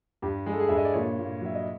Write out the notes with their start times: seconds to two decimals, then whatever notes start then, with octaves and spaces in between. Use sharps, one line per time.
0.22 G2 G4
0.46 G#3
0.53 A4
0.59 G#4
0.68 G2 E5
0.77 D#5
0.85 D5
0.94 A#2 C#5
1.18 A#2
1.41 F#3 E5
1.55 D#5